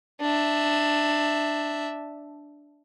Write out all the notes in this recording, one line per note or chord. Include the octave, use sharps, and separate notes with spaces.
D4 E5